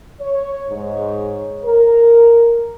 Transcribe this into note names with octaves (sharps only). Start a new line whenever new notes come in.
C#5
G#2 G#3 C#5
A#4